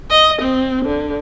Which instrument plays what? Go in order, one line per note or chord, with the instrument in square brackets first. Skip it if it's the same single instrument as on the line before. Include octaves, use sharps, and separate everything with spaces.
[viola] D#5
C4
D3